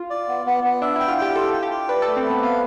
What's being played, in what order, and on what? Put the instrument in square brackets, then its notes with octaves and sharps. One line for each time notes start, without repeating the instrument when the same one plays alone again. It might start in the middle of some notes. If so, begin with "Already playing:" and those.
Already playing: [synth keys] F4
[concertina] D5
B3
B3
B3
[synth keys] D4 [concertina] E5
[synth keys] E4 [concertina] G5
[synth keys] F4
[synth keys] G4 [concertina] G5
[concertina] F4 [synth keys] A4
[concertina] G5
[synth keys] G4
[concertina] G5
[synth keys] B4 [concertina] D5
[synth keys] A4
[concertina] A3
[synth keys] C4
[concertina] B4
[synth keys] B3
[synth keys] B3 [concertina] F5